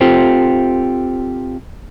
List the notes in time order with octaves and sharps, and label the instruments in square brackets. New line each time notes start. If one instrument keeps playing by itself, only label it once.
[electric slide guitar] C4 F4 G4 A4 C5